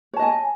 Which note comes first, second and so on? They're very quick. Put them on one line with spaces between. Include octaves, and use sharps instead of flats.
C#5 A5 D#5 G#5